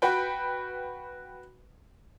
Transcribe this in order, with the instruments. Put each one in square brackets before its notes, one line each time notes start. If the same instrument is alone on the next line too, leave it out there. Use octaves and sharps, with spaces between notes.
[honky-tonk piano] F#4 B4 G5